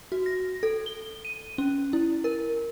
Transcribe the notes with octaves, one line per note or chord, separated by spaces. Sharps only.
F#4
A#6
A4
G7
D#7
C#4
E4
A#4